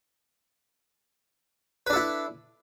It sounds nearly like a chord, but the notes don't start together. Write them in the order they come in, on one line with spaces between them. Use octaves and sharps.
B4 D4 A4 E4